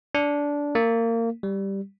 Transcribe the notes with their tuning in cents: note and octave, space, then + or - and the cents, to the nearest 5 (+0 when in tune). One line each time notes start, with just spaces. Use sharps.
D4 -15
A#3 -25
G3 +0